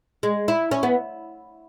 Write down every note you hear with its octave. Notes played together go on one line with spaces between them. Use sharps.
G#3
E4
C#4
B3